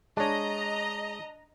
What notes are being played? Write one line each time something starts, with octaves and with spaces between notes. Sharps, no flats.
G#3 D4 C#5 D#5 A#5